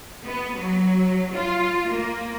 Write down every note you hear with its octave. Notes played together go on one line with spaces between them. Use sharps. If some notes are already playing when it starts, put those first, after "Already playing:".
B3
F#3
F4
A#3